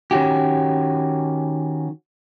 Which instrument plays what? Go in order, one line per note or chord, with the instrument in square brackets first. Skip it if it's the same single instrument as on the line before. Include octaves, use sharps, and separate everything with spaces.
[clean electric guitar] D#3 C#4 F#4 G4